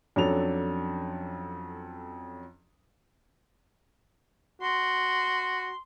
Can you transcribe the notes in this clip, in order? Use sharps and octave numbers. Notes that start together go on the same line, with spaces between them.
F2 F#3 C#4 D4 A4 F7
F#4 C6